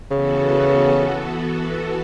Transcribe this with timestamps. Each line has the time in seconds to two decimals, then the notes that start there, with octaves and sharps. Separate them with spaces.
0.11 C#3 E3 B3 F#4 A4